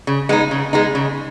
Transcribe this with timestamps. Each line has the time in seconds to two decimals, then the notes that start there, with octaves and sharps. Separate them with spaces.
0.07 C#3
0.29 G#3 B3 D#4
0.51 C#3
0.73 G#3 B3 D#4
0.95 C#3